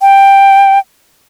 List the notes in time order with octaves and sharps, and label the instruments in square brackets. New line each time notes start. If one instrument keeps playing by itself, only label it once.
[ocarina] G5